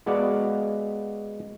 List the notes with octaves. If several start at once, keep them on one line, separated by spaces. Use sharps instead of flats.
G#3 B3 F#4 D5 F5